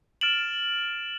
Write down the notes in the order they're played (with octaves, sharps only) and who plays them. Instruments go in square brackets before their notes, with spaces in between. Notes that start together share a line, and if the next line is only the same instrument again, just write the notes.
[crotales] F6 A6 D7 E7 F#7